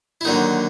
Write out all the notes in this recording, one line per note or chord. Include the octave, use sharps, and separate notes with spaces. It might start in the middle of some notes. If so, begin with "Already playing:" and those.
E4
D#2 D3 F#3 D#4